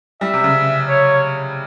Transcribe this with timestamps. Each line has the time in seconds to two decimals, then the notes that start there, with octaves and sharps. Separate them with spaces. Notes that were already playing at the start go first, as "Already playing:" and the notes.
0.21 G3 E5
0.34 C3
0.44 C#3
0.89 C#5